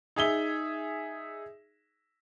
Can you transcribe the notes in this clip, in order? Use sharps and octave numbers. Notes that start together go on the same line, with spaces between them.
D#4 G#4 E5 G7